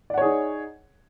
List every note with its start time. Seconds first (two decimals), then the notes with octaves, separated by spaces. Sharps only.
0.10 D5
0.14 F#5
0.18 C#5
0.21 G#4
0.25 D#4